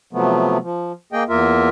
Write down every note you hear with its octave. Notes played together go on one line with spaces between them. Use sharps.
C3 F3 F#3 A3 B3
F3
A#3 G#4 D#5 G5
E2 A#3 F4 A#4 E5